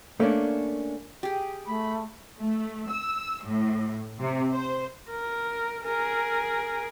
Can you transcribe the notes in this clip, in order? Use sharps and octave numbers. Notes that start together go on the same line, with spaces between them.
A3 A#3 C#4 D4
G4 G#4
A3 B5
A3
E6
A2
C3
C5
A#4
G#4 A#4